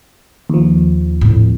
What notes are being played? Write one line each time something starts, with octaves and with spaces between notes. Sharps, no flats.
D#2 F3
A2 C4